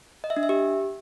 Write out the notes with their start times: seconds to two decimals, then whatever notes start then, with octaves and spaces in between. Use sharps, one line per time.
0.24 D#5
0.30 E5
0.37 D4
0.43 E5
0.49 G4